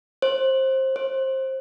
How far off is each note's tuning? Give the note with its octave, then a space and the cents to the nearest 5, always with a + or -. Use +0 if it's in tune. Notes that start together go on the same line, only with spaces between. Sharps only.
C5 +20
C5 +20